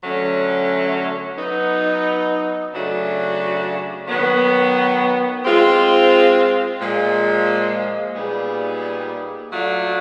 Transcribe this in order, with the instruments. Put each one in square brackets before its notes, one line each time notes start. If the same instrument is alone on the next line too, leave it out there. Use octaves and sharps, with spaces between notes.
[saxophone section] D3 F#3 A3 C#4
F#3 B3 D#4
C#3 F#3 A3 D4 F#4
D#3 F#3 B3
G#3 C4 F4
A#2 F3 G#3
A#2 G3 B3 D#4 G#4
F#3 A3 D4 F4